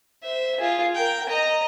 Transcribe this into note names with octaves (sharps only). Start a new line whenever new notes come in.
C5 E5
F4 G#4
A#4 G5
D#5 A#5